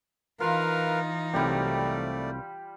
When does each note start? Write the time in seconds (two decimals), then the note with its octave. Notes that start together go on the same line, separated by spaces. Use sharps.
0.40 E3 D#4 F4 A#4 B4 F5
1.34 C2 C3 F#3 G3 A3 G4 D5